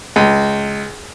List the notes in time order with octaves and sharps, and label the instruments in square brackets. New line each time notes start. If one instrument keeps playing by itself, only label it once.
[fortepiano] C#2